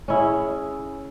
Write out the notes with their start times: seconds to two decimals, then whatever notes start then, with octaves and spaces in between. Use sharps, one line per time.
0.08 C#4 E4 G#4